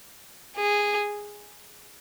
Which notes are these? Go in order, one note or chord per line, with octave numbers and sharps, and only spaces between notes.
G#4